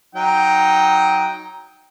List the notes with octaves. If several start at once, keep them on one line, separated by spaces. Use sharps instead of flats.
F#3 D#4 G5